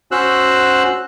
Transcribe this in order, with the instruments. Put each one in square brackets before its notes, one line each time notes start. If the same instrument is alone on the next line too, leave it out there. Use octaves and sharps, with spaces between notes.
[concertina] C#4 F#4 C5 E6 F#6